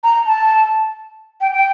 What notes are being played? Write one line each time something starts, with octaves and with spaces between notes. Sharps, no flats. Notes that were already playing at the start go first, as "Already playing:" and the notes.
A#5
A5
G5
G5